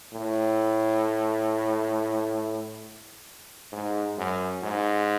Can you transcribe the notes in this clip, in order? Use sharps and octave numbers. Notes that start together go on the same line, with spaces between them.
A2
G#2
F#2
G#2